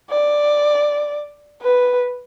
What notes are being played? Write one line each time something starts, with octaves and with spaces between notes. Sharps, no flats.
D5
B4